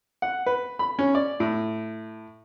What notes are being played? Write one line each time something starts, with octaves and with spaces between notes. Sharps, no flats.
F#5
B4
B5
C#4
D5
A2